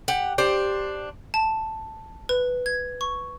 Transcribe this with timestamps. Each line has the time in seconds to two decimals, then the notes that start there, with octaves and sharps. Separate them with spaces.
0.08 G4 F#5
0.38 D4 G4 C5
1.34 A5
2.29 B4
2.66 G#6
3.01 C#6